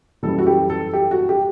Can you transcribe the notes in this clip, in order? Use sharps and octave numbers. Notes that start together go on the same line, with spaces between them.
F#2 E3 G3 A4
F#4
G4
A4
G4
F#4
G4